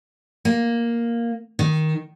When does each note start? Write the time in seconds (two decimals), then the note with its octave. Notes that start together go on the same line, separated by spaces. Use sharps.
0.45 A#3
1.59 D#3